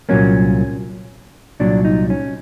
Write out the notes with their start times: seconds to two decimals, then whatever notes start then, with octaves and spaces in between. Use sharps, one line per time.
0.09 C2 A#2 F#3 A#3 C#4
1.60 C2 A#2 F#3 D4
1.85 D#4
2.10 C#4